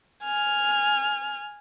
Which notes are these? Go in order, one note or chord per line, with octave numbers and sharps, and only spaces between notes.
G#5 F6